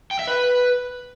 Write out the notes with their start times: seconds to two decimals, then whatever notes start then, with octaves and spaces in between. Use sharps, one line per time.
0.11 G5
0.19 E5
0.27 B4